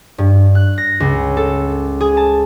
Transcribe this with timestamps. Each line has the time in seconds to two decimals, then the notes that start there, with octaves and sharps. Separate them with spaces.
0.18 G2
0.55 F#6
0.78 A#6
1.00 C#2
1.37 A4
2.01 G#4
2.17 A5